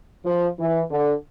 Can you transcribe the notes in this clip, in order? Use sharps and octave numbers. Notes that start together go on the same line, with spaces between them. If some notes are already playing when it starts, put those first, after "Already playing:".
F3
E3
D3